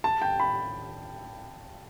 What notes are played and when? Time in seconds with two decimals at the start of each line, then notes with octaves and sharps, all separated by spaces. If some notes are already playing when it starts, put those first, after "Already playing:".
0.04 A5
0.22 G5
0.40 B5